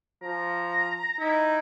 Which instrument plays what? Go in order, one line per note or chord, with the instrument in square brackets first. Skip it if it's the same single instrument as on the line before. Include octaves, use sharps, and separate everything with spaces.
[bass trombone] F3 [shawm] A#5
[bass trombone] D#4 [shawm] E4